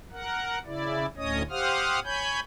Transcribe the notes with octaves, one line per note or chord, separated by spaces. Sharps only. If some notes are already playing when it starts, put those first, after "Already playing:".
A#4 F#5
C#3 E4 D5
D2 A2 C#4 C#5 D#5 D#6
G4 C5 F5 F#5 D#6 F6
C#5 G#5 B5 G6